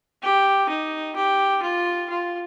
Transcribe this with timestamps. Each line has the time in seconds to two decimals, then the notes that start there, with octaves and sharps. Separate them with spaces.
0.22 G4
0.70 D#4
1.15 G4
1.62 F4
2.09 F4